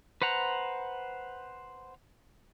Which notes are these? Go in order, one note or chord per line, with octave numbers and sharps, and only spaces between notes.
B4 C5 F#5 A#5